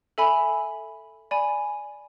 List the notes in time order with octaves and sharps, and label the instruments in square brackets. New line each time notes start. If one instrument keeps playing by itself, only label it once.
[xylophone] A4 E5 G#5 B5
D5 G#5 B5